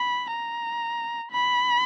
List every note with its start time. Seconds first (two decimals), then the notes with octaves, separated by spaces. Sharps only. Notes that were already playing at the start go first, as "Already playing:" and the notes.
Already playing: B5
0.31 A#5
1.31 B5